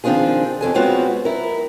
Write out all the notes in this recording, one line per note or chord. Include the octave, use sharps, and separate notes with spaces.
D#3 F3 C4 D4 F4 G#4
F2 A4 G#5
F#3 G#3 B3 C4 F4 F#4
E4 A#4